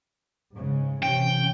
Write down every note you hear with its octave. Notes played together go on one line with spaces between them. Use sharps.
G#2 C#3 G#3
C3 E3 C#4 G5